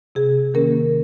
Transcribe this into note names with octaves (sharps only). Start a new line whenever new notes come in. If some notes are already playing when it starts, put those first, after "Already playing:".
C3 G#4
D#3 A#3 C#4 A#4